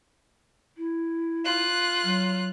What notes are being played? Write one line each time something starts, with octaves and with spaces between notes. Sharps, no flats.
E4
F4 F#6
F#3